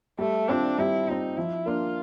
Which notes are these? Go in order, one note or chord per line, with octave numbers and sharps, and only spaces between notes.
G3 A3
C4 D4 F4
G3 E4
C4 D#4 F4
F3 E4
A#3 D4 F4